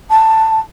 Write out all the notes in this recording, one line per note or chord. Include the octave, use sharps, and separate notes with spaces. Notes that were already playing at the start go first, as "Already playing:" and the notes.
A5